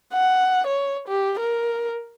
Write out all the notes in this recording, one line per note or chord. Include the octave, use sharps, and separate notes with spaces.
F#5
C#5
G4
A#4